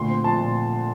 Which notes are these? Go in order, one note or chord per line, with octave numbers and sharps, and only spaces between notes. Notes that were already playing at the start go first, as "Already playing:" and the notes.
Already playing: D2 A#2 C6
C4
F3 A5
A#2